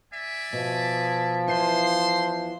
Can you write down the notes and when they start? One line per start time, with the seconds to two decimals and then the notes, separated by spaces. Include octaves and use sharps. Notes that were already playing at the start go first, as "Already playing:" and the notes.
0.14 D5 E5 G#5
0.53 B2 F3
1.48 E2 E3 C5 C6